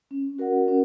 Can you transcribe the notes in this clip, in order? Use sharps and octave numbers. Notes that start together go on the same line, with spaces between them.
C#4
F#4 A#4 D5 F#5
C#4